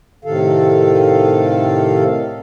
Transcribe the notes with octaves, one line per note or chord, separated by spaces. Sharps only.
A2 C3 D#3 A4 F5